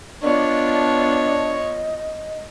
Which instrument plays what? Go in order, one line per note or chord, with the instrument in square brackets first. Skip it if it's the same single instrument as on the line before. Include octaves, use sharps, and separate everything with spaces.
[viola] B3 F4 [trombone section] D4 [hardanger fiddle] C#5 [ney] D#5